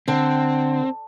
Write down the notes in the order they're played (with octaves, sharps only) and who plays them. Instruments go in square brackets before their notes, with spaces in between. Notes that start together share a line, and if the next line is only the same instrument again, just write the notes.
[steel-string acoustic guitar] D3 [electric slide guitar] C4